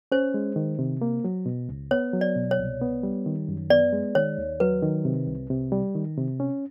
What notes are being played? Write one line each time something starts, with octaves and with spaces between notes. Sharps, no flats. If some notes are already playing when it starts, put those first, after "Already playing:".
C#4 C5
G#3
D#3
C3
A#3
F#3
B2
C#2
B3 C#5
F#3
D5
B2
C#5
C2
B3
G3
D#3
F#2
B3 D5
G#3
D#3 C#5
D#2
F#3 B4
D#3
C3
C2
C3
G3
D#3
C3
C#4